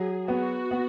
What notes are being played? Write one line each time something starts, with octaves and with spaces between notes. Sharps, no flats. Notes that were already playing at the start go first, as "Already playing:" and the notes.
Already playing: F#3 G#4
B3 F#4
B3